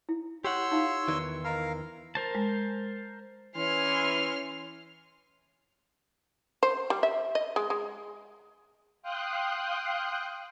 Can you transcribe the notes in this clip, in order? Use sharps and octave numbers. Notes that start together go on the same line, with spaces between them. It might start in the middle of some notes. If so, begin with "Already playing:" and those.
E4
G4 C#5 F#5 C6 E6
D#4 F4 F5
E2 D#3 E3 D5
A#4 D#5 F5 A#5 B5
A#4 C5 A5
G#3
E3 C#4 G#5 C6 F6
C5
G3
E5
D#5
G#3
G#3
F5 G5 C6 D#6 F#6